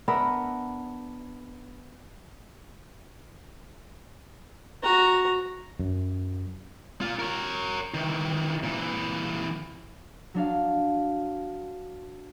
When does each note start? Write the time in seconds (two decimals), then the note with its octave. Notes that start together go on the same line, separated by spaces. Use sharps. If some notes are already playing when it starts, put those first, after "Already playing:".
0.08 B3 D4 A#4 E5
4.83 F#4 A#5
5.79 F#2
7.01 A#2 F4
7.19 A#4 C#5
7.94 D#3 E3
8.63 A#2 E3
10.34 F#3 D4 F5